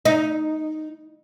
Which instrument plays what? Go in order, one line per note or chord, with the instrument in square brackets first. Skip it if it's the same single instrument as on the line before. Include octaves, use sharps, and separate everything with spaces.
[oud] D#4